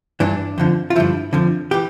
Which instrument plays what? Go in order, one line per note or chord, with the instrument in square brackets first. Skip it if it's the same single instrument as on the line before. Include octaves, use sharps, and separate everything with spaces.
[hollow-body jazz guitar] G2 E3 D4
F2 D3 F3
F4
G2 D3 F3 E4
F2 D3 F3
E3 G4